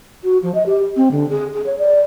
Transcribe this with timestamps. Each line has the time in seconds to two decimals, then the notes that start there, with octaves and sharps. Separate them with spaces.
0.24 F#4
0.43 F3
0.55 D#5
0.66 G4
0.97 C4
1.11 D3
1.30 G#4
1.54 G#4
1.66 C#5
1.78 D5